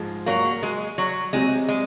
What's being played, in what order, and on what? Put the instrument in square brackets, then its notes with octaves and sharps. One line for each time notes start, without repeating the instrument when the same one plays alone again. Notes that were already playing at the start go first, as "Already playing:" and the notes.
Already playing: [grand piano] G#2 F3 G#3
[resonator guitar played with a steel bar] F#3 A#3
G#3
F#3
[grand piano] C3 F#3 C4 [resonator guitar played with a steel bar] G#3
[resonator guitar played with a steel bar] G#3